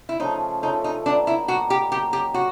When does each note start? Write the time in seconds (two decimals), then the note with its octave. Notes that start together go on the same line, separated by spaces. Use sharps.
0.09 E4
0.20 C#3 F3 A3 D#4
0.62 C#3 F3 A3 D#4
0.84 D#4
1.05 A#2 G3 B3 D4 D#4
1.27 E4
1.48 A#2 G3 B3 D#4 F#4
1.70 G4
1.92 C#3 F#3 A#3 G4
2.13 G4
2.34 C#3 F#4